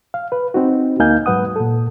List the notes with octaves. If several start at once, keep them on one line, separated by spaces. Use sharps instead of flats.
F5
B4
C4 D#4 F#4
D2 A#3 D#4 F5 G#5 G6
G#2 F#3 B4 F#5 D#6
A#2 A4